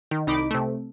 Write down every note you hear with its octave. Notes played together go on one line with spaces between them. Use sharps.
D#3
C2 D#4 B5 D6
C3 A3